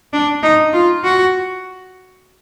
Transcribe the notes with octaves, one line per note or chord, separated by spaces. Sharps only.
D4
D#4
F4
F#4